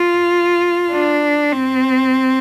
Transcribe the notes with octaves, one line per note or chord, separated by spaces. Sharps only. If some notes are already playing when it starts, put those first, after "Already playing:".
Already playing: F4
D4
C4